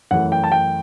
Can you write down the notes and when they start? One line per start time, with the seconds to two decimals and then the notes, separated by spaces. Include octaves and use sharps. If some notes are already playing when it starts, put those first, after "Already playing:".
0.11 F#2 E3 A3 F#5
0.32 G5
0.44 A5
0.52 G5